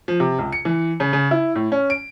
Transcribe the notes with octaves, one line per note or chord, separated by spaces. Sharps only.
F3
C3
C#2
C#7
E3
C#3
C#3
E4
A2
C#4
D7